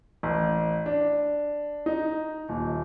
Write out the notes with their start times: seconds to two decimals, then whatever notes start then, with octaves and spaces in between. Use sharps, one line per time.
0.23 A1
0.86 D4
1.86 D#4
2.49 D#1